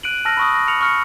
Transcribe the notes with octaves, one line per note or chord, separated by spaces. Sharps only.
F#6 D7 D#7 F#7
A5 E6 F6 A#6 F#7
B5 C#6 D#6
A#6
B5 F6 C#7 F7 F#7
C#6 F6 C#7